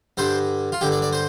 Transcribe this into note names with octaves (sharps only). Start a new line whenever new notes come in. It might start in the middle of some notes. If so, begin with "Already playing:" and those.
G2 D3 C5
F4
G2 D3 G4
D5
D5
C5